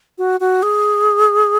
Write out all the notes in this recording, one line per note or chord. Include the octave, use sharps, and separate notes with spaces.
F#4
F#4
G#4